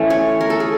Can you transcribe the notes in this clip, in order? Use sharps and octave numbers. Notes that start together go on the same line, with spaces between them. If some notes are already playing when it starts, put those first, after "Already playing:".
Already playing: E3 A3 C#4
C#5
A#4
A4
G#4